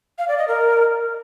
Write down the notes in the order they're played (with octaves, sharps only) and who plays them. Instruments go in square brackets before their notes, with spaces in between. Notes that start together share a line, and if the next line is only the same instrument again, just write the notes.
[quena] F5
D5
D#5
A#4